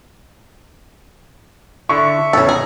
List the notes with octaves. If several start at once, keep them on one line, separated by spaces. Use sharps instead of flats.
D3 D4 E4 E5 C#6
E2 A2 C#3 A4 C#5
G#4 A#5